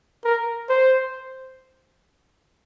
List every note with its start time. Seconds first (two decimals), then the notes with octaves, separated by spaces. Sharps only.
0.25 A#4
0.69 C5